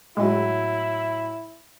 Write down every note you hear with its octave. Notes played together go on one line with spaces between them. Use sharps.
A2 F#3 G#3 E4